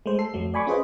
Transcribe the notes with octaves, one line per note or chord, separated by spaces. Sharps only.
G#3 A3 C5
A4 C7
F2 F#3 A3
D5 G#5 B5 C#6 D6
C#4 F4 G#4 B4 C5 D#5